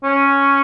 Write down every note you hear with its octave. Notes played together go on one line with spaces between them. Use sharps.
C#4